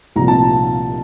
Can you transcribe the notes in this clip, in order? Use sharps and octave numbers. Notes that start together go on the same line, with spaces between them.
C2 A#2 F3 A#5
A5